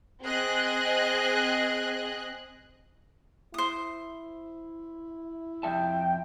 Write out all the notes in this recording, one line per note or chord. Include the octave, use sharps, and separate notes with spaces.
C4 G#4 D#5 F#6
E4 C5 D#6
F2 E5 G5 A5